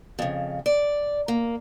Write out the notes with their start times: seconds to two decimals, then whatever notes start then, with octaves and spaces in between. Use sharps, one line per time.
0.19 F2 C#3
0.66 D5
1.28 A#3